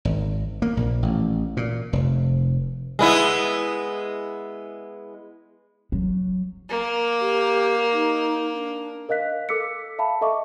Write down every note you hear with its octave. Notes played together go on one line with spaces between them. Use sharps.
G#1
A#3
A#1
A1
A#2
F1
G#3 B3 E4
F#3
A#3
G4
D#4
D4
A#4 D#5 F5 F#6 B6
A4 D6 E6 B6 C#7
E5 F5 A5 B5
A4 D#5 E5 C#6 D6